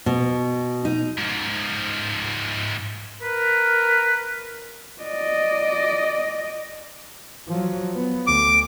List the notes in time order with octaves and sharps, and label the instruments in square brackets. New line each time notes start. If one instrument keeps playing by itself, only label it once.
[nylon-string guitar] B2
D#4
[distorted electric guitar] G#2 F3
[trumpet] A#4 [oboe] B4
[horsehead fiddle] D5 D#5
[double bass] F3 F#3
B3
[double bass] D2 [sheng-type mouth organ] D6